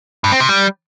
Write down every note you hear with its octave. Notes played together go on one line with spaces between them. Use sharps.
G2
C4
C3
G3